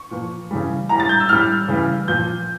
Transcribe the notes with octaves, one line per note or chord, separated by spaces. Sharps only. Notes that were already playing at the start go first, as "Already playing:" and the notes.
Already playing: C#6
A#2 F3
C#3 E3 G3
A2 G3 A#5
A6
G6
E6
A2 G3 F6
C#3 E3 G3
A#2 F3 G6